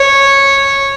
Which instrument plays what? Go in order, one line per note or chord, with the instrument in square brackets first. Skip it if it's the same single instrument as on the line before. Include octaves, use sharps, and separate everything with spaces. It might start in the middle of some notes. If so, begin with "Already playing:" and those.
Already playing: [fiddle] C#5